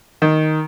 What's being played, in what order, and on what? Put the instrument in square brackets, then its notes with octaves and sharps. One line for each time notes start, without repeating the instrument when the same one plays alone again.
[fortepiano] D#3